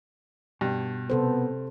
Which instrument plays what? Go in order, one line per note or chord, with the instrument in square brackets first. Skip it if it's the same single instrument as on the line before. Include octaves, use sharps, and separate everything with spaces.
[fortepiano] G2 [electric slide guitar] B2
[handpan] C3 A4 C5 [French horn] B3